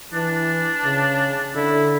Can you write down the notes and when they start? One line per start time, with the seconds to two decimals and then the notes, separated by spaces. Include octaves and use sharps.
0.13 E3 D4
0.85 C#3
1.56 D3 E4